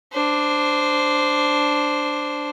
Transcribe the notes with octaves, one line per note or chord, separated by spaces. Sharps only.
D4 C5